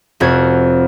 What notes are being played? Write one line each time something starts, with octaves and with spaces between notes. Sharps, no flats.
F1 F2 F#4 G#6